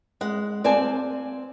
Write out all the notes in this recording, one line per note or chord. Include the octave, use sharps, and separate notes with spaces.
G#3 F#5
C4 D5 F5 G#5 A5